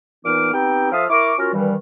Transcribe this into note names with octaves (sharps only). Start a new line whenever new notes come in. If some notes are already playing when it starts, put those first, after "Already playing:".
A#2 E3 B3 D#4 D6 F6
B3 C4 D#4 G4 G5
F3 A4 E5 F5 D#6 F6
E4 A#4 C#6 D6
C#4 F4 F#4 A#4
G2 D#3 E3 G3